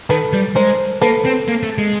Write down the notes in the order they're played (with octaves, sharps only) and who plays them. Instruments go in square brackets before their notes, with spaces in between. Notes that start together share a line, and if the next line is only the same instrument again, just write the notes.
[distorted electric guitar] D#3 [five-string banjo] A4 B4
[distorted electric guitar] G3
[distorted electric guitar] G#3 [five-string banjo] A#4 C5
[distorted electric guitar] A#3 [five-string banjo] A4 B4
[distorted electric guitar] C4
A#3
A3
G#3